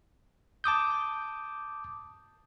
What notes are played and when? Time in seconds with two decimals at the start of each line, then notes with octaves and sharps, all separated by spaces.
0.64 A5 D6 D#6 G6